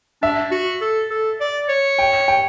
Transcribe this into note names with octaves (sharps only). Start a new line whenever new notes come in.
D4 E5
F#4
A4
A4
D5
C#5
G5
G5